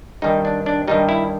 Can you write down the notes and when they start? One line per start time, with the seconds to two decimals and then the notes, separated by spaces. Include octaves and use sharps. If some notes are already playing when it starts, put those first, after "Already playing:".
0.22 G2 D#3 G3 D#4
0.45 D4
0.66 D4
0.88 G2 D#3 G3 D#4
1.09 E4